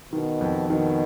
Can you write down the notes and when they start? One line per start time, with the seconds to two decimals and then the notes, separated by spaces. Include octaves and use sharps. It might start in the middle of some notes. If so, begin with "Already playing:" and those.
0.13 B2 D#3
0.41 F2
0.70 B2 D#3